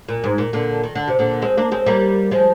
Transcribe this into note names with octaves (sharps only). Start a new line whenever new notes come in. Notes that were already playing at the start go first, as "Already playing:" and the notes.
A#2
G#2
A#2
A#2 D3
D#3
D3
C3
A#2 D3
G#3 C4
A#3 D4
G#3 C4
G3 A#3
F3 G#3